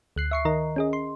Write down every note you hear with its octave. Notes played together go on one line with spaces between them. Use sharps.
D2 F#6 C7
E5 C#6 C7
D#3 A#4 D#5 A#5
C#4 G#4 D#5
C6